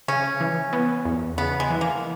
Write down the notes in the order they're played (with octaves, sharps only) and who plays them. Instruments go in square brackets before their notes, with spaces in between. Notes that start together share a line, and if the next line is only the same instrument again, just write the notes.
[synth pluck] C#3 [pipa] C#4
[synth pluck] E3
B3
E2
[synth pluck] C#3 [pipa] B3
[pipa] G#3
[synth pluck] E3
[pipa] A#3